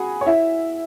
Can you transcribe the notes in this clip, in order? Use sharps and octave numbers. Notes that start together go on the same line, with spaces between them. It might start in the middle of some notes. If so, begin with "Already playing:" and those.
Already playing: F#4 G#4 F#5 G#5 B5
C#5
E4 E5